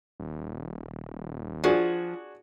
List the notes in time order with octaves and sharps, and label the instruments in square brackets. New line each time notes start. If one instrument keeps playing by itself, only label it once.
[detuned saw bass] D#1
[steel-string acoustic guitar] F3 [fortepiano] D4 F#4 G#4